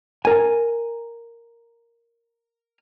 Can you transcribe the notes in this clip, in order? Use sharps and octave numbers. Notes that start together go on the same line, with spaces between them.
A#4 G#5